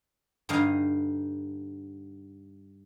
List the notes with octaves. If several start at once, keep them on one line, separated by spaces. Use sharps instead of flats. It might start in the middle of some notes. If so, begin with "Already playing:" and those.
G2 D3 D#4 D#5 F5